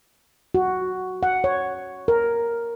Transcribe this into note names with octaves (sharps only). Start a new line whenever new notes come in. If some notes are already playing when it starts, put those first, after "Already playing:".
F#4
F#5
C#5
A#4